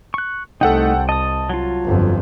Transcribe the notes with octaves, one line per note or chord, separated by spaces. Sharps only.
C#6 F#6
C2 A3 D#4 A4 F#5 G5
D#5 A5 D#6
F#3 F4
G1 F2